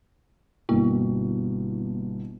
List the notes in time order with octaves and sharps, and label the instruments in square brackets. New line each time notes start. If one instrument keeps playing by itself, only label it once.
[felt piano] G1 B2 [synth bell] A#3 E4